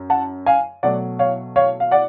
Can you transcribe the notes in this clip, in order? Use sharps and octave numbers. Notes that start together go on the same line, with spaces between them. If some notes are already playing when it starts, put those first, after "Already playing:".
Already playing: F#2
F#5 A5
F5 G#5
B2 F#3 A3 D5 F#5
C#5 F5
C#5 F5
F5
D5 F#5